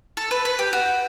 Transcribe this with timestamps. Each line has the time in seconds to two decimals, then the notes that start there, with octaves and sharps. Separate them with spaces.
0.17 A4
0.31 B4
0.45 B4
0.59 G4
0.73 F#4